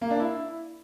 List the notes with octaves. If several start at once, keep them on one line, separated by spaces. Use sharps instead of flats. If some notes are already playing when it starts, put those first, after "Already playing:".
A#3
D4
E4